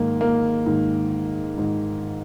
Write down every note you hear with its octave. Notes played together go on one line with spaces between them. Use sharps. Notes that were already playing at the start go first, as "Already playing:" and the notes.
Already playing: G#2 D#3 A#3
A#3
G#2 D#3
G#2 D#3